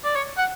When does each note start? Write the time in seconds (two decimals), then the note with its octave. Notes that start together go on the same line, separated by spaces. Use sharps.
0.04 D5
0.16 C#5
0.38 F#5